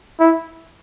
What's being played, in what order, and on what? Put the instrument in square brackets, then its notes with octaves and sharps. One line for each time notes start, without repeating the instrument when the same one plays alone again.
[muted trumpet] E4